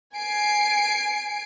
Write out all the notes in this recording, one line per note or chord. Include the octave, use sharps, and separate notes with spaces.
G#5 C7 D7